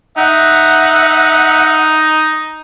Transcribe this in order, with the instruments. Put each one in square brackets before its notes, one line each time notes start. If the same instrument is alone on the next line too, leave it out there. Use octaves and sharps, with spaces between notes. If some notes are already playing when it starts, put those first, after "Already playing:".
[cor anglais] D#4 [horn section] E5 F#5